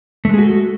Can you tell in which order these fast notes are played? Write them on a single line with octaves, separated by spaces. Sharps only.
A3 G#3 G#4 F#4 A4